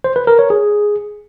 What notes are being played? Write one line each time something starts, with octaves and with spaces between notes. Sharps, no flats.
C5
B4
A#4
C#5
G#4